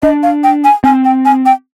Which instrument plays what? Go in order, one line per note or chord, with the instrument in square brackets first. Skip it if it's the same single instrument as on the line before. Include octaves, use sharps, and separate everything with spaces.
[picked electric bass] D4 [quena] D#5
[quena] F5
G5
G#5
[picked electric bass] C4 [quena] G#5
[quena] G5
G#5
G5